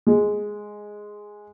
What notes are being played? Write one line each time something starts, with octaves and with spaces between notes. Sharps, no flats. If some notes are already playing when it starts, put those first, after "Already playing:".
G#3